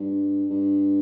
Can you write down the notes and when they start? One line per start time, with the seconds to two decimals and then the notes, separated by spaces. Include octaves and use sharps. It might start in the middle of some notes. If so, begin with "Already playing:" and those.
Already playing: G2
0.50 G2